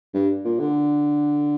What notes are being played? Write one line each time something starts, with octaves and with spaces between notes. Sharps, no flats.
G2
A#2
D3